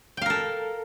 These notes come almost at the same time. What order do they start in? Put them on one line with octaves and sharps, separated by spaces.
G5 F5 A#4 A4